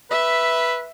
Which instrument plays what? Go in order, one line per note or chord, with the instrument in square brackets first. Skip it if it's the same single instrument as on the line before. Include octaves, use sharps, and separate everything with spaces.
[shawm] B4 [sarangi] E5